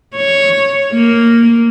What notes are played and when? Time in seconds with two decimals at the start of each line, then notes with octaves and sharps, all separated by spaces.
0.17 C#5
0.94 A#3